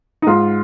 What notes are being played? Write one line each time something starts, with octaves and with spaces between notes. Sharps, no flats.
D#4
G#2 F4